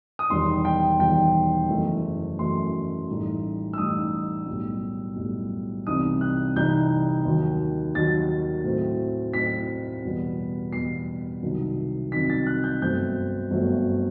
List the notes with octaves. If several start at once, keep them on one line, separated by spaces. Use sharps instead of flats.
D#6
E1 E2 D#3 G3 C6
G5
E1 E2 D#3 G3 G5
F#1 F#2 E3 A3
F#1 F#2 E3 A3 C6
A1 A2 G3 D#4
E6
A1 A2 G3 D#4 D#6
B1 A2 G3
B1 A2 G3
C2 C3 E3 G3 D#4 D#6
F#6
C2 C3 E3 G3 D#4 G6
D#2 D#3 F#3
D#2 D#3 F#3 A6
A2 F#3 C4 E4
A2 F#3 C4 E4 B6
E2 B2 G3 B3
E2 B2 G3 B3 C7
C2 C3 D#3 F#3
C2 C3 D#3 F#3 B6
A6
F#6
G6
G1 G2 F#3 A3 C4 G6
G1 G2 F#3 A3 C4